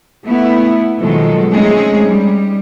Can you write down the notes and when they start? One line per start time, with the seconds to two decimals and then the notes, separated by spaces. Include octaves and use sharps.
0.24 A3 B3 E4
0.99 B2 D#3 F3 F#3 G#3 A4
1.53 G#3 A3 C4 C#4 D#4 G#4
2.07 G3